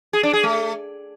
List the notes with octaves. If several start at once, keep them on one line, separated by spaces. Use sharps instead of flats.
G#4
D4
G#4
A3